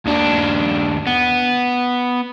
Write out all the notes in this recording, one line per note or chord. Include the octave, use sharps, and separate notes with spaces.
D#2 D4
B3